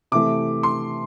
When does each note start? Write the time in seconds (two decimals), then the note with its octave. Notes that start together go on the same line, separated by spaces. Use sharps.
0.12 C3 E3 A3 D6
0.63 C6